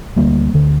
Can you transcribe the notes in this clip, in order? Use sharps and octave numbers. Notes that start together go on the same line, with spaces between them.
D2 D3 G3 A#3
D2 D3